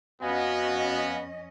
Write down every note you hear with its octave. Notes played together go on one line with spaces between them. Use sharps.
F2 B3 C#4 F#4 D#5 F5 G#5